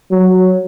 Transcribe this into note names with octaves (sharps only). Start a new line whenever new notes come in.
F#3